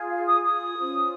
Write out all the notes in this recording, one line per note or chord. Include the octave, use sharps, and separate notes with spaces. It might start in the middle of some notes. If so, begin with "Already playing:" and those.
Already playing: F4 G#4
F5
D#6
D#6
C#4 F4 C5